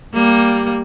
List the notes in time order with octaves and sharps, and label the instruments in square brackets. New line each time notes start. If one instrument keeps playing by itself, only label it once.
[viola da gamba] G3 A#3